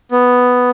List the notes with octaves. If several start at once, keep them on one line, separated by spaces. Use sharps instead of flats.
B3